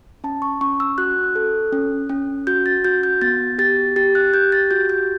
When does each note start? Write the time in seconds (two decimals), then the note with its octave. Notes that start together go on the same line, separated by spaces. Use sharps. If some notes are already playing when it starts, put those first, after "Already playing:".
0.24 C#4 A5
0.42 C#6
0.61 C#4 C#6
0.80 E6
0.98 F#4 F#6
1.35 A4
1.73 C#4
2.09 C#4
2.47 F#4 G6
2.66 A6
2.84 F#4 G6
3.03 G6
3.21 B3 A6
3.58 G4 A6
3.96 G4 A6
4.15 F#6
4.34 G4 G6
4.52 A6
4.71 F#4 G6
4.89 G6